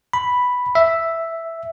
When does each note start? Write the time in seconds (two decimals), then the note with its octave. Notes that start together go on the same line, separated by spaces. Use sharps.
0.13 B5
0.75 E5